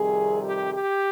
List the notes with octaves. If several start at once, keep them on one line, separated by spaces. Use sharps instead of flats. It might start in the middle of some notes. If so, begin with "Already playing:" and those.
Already playing: F2 C3 D#3 G3 G#4
G4
G4